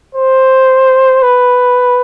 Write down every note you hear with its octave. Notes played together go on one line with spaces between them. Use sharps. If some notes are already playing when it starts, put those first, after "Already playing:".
C5
B4